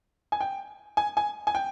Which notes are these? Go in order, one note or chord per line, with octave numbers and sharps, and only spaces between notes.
G#5
G5
G#5
G#5
G#5
G5